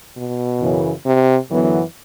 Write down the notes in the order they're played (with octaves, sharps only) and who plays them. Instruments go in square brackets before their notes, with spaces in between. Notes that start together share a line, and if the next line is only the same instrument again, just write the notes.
[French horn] B2
[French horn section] F#2 C#3 E3
[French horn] C3
[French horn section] F#2 D3 F#3 B3 [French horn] E3